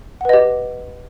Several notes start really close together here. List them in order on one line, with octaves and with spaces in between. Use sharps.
F#5 B4 D#5 G4